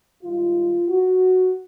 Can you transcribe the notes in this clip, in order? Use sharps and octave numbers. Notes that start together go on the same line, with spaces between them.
G#2 D#3 G3 F4
F#4